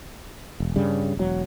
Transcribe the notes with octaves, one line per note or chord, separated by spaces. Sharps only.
E1
G2 C#3 G3
E1 F#3